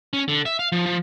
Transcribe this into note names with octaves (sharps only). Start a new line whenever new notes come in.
C#4
D3
E5
F5
F3
F3